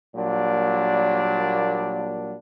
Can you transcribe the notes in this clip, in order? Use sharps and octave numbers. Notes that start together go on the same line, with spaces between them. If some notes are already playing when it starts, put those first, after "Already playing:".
A#2 F#3 G3 A#3 D4